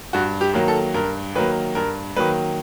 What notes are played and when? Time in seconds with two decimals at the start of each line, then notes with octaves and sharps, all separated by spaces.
0.13 G2 F#4
0.41 G4
0.54 D#3 F#3 A#3
0.68 A4
0.94 G2 A#4
1.35 D#3 F#3 A#3 B4
1.75 G2 A#4
2.16 D#3 F#3 A#3 B4